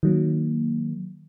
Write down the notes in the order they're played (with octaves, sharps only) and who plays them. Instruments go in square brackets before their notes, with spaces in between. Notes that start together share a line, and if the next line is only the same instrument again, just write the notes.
[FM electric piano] D#3 F#3 A#3